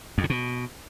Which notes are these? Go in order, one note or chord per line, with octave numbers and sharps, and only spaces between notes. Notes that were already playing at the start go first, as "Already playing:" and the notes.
F2
C3
B2